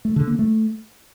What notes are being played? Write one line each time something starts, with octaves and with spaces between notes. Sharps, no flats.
A3
D3
A#3
A3